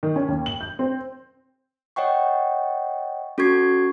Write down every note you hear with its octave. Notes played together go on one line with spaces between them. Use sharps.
D#3
C#4
D#2
F#7
G6
C4
C#5 D#5 F#5 G5 C#6
C#4 F#4 A4 C#6 G#6 C7